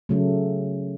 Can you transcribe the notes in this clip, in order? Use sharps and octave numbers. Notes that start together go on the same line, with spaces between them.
C#3 F#3 A3